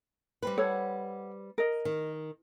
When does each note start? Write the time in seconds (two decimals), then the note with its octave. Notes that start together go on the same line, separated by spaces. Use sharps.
0.43 G3 C4 B4
0.58 A4 C#5 F#5
1.58 A#4 D#5
1.85 D#3